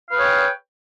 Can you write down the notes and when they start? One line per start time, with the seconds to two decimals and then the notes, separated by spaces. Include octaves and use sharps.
0.09 F5
0.12 B4
0.15 G#4
0.19 C#5
0.22 G5